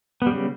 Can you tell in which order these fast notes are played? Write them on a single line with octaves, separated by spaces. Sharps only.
B3 G3 C#3